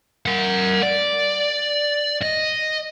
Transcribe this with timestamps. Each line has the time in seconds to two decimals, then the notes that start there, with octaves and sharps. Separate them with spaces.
0.26 A#4 F#5
0.83 D5
2.23 D#5